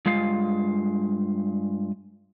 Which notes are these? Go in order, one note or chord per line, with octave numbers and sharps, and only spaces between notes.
G2 G#3 F4 F5